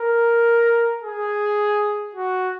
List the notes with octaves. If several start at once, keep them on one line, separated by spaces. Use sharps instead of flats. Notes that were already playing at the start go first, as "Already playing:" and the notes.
Already playing: A#4
G#4
F#4